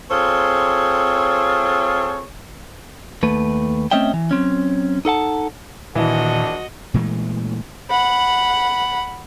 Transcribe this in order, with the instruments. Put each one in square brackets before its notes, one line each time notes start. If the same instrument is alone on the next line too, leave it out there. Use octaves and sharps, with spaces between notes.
[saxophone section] C4 F4 G#4 A4 C5 C#5
[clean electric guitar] D#2 A3 B4
A3 C4 C#4 D#5 E5 G5
E3
F#3 C4 C#4
D#4 A4 F#5 A5
[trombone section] A#1 D4 [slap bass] A#2 D#3 [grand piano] E3 [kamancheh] F#4 D#5
[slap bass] A#2 E3 G#3 A3
[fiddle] F#5 B5